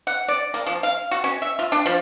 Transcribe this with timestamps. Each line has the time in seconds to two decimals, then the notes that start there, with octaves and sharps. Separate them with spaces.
0.07 F#5
0.28 D5
0.54 A#3
0.67 F3
0.83 F5
1.11 F#4
1.24 C#4
1.42 E5
1.59 F4
1.72 D4
1.86 F3